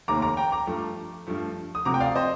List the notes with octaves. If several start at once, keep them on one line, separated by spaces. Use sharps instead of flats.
F1 D#2 D#3 A#5 D6
A#5 D6
G5 A#5
A#5 D6
G2 F3 A3
G2 F3 A3
D#6
D2 C3 F3 C4 A#5 D6
G5
D5 F5
C5 D#5